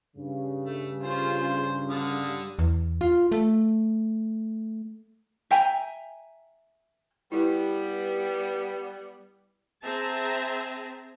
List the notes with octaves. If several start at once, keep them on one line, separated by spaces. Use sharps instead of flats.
G2 C#3
A3
C#4 F4 G#4 C5
D3 G3 F5 D#6
E2
F4
A3
E5 G5 G#5 A#5
G3 B3 E4 G4 B4
C4 G#4 E5 A5 A#5